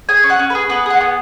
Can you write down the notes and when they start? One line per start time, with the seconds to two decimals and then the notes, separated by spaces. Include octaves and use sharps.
0.09 G#4 G#5
0.24 C#4
0.30 F#5
0.39 C#4
0.50 G#4 B4
0.69 B3 B4
0.86 G#4 F#5
1.01 B3